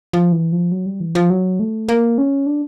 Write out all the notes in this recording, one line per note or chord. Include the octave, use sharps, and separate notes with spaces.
F3
E3
F3
F#3
G3
E3
F3
F#3
A3
A#3
C#4
D4